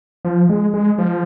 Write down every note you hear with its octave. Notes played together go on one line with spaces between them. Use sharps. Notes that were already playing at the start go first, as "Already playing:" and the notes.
F3
G#3
G#3
F3